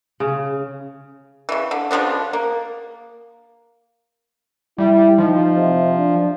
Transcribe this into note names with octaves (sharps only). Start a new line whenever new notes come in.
C#3
C#3 E3
D3
C#3 F3 B3 D4
A#3
G3 E4
F3 D#4
C3
D4